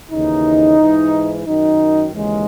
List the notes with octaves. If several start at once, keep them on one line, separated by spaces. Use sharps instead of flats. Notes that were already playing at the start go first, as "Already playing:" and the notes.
D#2 C#3 E3 D#4
G#2 E3
F#2 D#3 D#4
D#2 C#3 E3 G#3